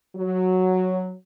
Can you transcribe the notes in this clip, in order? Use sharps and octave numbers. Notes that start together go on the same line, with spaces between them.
F#3